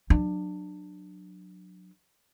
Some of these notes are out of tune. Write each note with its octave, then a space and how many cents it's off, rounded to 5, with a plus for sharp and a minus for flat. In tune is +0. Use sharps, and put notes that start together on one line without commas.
F#3 -15 D4 +20